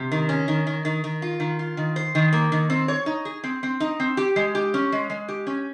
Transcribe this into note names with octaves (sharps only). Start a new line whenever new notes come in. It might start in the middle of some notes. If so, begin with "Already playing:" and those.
Already playing: C3
D#3
C#4
D#3
D#3
D#3
D#3
F4
D#3
F4
D#3
C5
D#3
A#3
D#3
C4
C#5
D#4
G#4
C4
C4
D#4
C4
G4
G#3
G4
C#4
G#3
G#3
G4
C#4